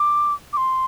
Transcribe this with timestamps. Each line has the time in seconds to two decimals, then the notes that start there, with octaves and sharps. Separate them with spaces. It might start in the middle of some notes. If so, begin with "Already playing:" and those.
Already playing: D6
0.53 D6
0.57 C6